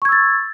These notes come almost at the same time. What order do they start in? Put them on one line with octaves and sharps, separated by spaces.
C#6 G#6 E6 A6